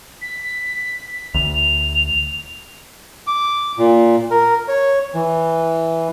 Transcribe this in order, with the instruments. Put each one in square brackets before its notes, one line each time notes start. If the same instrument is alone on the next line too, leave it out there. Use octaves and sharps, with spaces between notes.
[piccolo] B6
[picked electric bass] D2 [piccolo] F7
[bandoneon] D6
A#2
A#4
C#5
E3